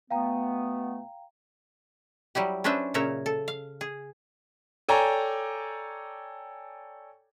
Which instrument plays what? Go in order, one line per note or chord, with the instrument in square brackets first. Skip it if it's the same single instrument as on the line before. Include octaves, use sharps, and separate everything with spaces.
[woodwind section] B2 A3 B3 [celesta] F5 G5 A#5
[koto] F#3 G3 E4 G4
C#4 D4 B4 C5 E5
A#2 C#3 A#4 C#5 E5
A4
F5
G#4
[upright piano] A4 C#5 D5 G5 G#5 A#5